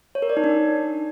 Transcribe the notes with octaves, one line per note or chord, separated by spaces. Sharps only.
C#5
A#4
D5
D#4
D4